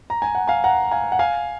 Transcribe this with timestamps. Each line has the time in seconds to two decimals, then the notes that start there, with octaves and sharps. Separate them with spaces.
0.10 A#5
0.22 G#5
0.35 F#5
0.48 F5 G#5
0.64 F#5 A#5
0.91 F5 G#5
1.12 F#5
1.19 F5 G#5